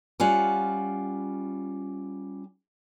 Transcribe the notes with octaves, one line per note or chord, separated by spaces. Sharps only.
G3 C#4 F4 F#5